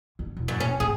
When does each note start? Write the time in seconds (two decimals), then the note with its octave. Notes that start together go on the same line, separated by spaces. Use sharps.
0.19 D3
0.37 E1
0.48 F#2
0.60 C#4
0.80 G#2 G#4